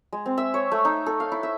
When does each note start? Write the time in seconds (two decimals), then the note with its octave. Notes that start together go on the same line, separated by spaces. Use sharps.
0.13 G#3
0.26 C4
0.38 E5
0.54 C#5
0.72 A3
0.85 D#4
1.06 A4
1.20 F5
1.32 E4
1.43 E5